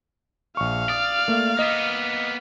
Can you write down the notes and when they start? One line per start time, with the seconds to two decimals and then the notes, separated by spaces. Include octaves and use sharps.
0.57 A#1 F5 C#6
0.89 D5 D#6
1.28 A3 A#3
1.59 A#3 B3 D#5